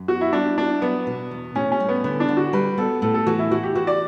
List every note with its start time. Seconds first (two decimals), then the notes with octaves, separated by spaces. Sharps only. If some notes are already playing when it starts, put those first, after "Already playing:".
Already playing: F#2
0.08 B3 F#4
0.21 E4
0.33 G3 D4
0.58 D4 E4
0.82 F#3 B3
1.07 B2
1.31 E2
1.55 A2 C#4
1.72 C#4
1.80 G3
1.89 B3
2.04 D3 B3
2.20 D4
2.28 D3
2.37 F#4
2.53 G3 B4
2.78 B3 A4
3.02 A2 A4
3.14 A4
3.26 E3 F#4
3.39 E4
3.51 E3 F#4
3.63 G4
3.75 E3 F#4
3.87 D5